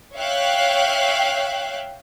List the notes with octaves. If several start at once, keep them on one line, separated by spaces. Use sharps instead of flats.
C#5 E5 F5 G5 F#6